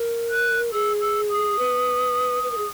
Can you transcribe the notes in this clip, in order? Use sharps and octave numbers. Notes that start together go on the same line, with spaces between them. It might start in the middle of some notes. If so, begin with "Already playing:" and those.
Already playing: A#4
F#6
G#4 E6
E6
D#6
B4
B4
A#4
G#4